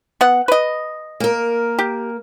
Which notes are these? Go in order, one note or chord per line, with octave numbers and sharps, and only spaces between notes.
B3 F#5
B4 D#5
A#3 A#4
G4